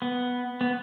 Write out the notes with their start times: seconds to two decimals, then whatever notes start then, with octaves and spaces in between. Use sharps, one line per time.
0.02 B3
0.61 B3